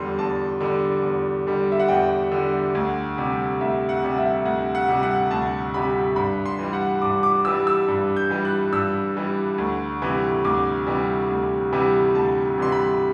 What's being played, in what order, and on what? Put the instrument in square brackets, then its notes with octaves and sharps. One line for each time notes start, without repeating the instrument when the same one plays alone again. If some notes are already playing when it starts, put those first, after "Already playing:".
Already playing: [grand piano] E2 D3 G3 C6
E2 A5
D3 G3
E2
D3 G3
E5
F#5
E2 G5
D3 G3
D2
C3 G3
D2 E5
F#5
C3 G3
E5
D2 F#5
F#5
C3 G3
F#5
D2 A5
C3 G3 B5
G2 B5
C6
E3 G3
F#5
G2 D6
D6
E3 G3 E6
E6
G2
G6
E3 G3
F#6
G2 E6
E3 G3
D2
C3 E3 G3
D2 D6
C3 E3 G3
D2
C3 E3 G3
D2 A5
C3 E3 G3 C6
B5